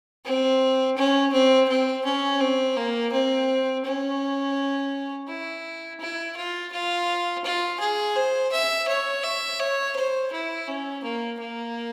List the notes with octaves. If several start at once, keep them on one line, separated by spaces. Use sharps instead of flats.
C4
C#4
C4
C4
C#4
C4
A#3
C4
C#4
E4
E4
F4
F4
F4
G#4
C5
E5
C#5
E5
C#5
C5
E4
C#4
A#3
A#3